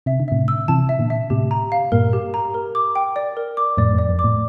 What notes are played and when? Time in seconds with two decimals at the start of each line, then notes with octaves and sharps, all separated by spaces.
0.06 C3 E5
0.20 D3
0.28 A2 C3 E5
0.48 E6
0.68 C3 E3 A5
0.89 E5
0.99 A#2 D3
1.10 E5
1.30 A2 C3 G4
1.51 A#5
1.72 F5
1.92 G2 A#2 A#4
2.13 G4
2.34 A#5
2.54 A#4
2.75 D6
2.95 G5
3.16 D5
3.37 A#4
3.57 D6
3.77 F2 A2 D5
3.93 F2
3.98 D5
4.09 F2
4.19 D6
4.24 A2